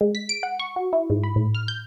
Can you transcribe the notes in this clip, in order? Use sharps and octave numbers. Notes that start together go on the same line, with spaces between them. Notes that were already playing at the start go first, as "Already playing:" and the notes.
G#3
B6
D7
F#5
C#6
F#4
E4
G#2
B5
A2
F6
G6